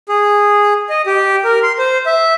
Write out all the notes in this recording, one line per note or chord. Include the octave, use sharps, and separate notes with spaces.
G#4
D#5
G4
A#4
C6
C5
E5